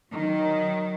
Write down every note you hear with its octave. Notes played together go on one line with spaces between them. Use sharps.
D#3 F#3